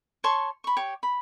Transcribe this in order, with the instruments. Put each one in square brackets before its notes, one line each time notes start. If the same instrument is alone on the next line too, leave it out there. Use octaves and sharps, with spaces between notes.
[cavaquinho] C#5 A5 C6 C#6
B5 C#6
G4 C#5
B5